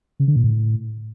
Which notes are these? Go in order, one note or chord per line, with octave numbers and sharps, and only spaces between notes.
C#3
D3
A#2
A2